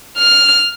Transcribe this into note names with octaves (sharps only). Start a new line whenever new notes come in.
F6